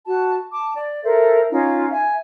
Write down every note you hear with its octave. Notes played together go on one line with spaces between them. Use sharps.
F#4 A5
A5 D6
D5
A4 A#4 C5 E5
C#4 D#4 F4 F5
E5 G#5